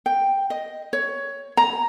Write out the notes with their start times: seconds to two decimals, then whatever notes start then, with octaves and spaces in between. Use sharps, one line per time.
0.06 G5
0.50 D#5
0.93 C#5
1.57 A#5